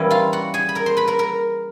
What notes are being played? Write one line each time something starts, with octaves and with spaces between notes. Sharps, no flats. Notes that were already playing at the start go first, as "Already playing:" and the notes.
Already playing: E3 G3 A#3 C#4 D#4 E4 D#5
F4 F5
F#4 F#5
G#4 G#5
B5
A#4 A#5
C5 C6
B4 B5
A#4 A#5
A#4 A#5